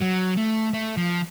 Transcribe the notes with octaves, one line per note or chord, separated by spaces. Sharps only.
F#3
A3
A3
F3